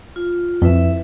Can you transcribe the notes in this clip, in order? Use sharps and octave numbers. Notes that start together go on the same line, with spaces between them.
F4
F2 E4 B4 E5